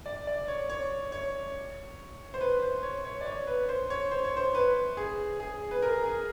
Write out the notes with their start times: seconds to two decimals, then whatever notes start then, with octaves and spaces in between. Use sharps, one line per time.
0.06 D5
0.27 D5
0.48 C#5
0.70 C#5
1.12 C#5
2.34 C5
2.41 B4
2.62 C5
2.83 C#5
3.05 C#5
3.21 D5
3.26 C#5
3.47 B4
3.69 C5
3.90 C#5
4.11 C5
4.24 C#5
4.37 C5
4.55 B4
4.97 G#4
5.40 G#4
5.71 B4
5.83 A#4
6.04 G#4